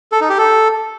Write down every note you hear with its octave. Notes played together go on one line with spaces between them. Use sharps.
A4
D#4
G4
A4